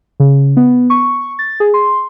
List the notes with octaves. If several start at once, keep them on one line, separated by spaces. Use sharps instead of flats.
C#3
B3
C#6
A6
G#4
C6